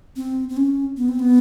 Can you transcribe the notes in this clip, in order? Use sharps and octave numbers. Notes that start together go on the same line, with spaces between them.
C4
C4
C#4
B3
C4
B3